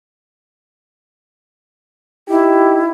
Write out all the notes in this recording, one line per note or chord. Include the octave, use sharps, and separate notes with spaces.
D#4 E4 G4